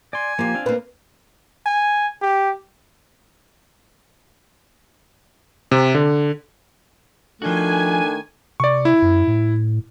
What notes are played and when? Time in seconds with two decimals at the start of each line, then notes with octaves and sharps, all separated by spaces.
0.13 D5 G#5 C6
0.39 F3 A#3 F4 G4
0.54 C4 D4 F5
0.66 A#3 B4
1.66 G#5
2.22 G4
5.71 C3
5.95 D3
7.42 D#3 F3 A3 D4 F#4 G#5
8.60 C3 D5 C#6
8.85 E4
9.02 F#2
9.27 A2